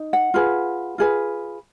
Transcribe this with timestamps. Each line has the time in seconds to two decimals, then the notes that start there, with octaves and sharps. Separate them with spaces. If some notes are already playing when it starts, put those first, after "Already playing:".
Already playing: D#4
0.13 F#5
0.34 F4 G#4 B4
0.98 F4 G#4 B4